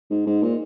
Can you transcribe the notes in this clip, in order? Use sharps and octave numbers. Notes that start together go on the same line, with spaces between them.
G#2
G#2
A#2